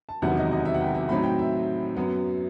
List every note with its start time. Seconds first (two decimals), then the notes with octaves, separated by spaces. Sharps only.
0.09 A5
0.22 E1 E2 C3 D#3 F#3 F#5
0.37 D#5
0.52 D#5
0.65 E5
0.74 F#5
0.81 G5
0.95 E5
1.09 A2 F#3 C4 D#4 B5
1.23 G5
1.39 E5
1.96 F#2 F#3 B3